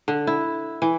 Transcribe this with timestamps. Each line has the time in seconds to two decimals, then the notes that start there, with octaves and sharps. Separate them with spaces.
0.08 D3
0.27 E4
0.82 E3